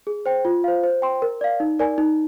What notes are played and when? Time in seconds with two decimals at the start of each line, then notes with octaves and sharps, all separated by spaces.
0.07 G#4
0.26 C5 G5
0.45 F4
0.64 C5 F5
0.84 C5
1.02 G5 C6
1.22 A#4
1.41 D5 F5
1.60 D#4
1.79 A#4 D5 G#5
1.98 D#4